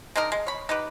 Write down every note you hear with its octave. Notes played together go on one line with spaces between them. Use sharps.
G#3 D4 D#4 A#4
G#3
C#5 B5
D#4 G4 B4